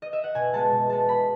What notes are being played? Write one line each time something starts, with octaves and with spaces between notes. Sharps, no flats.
D#5
E5
F#5
B2 G#5
G#3 B3 A5
B2
G#3 B3 A5
B2 B5